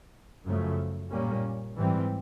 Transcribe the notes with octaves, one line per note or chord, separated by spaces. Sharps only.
F#2 C#3 F3 A3
A#2 G3 A#3 C#4
G#2 E3 G3 C4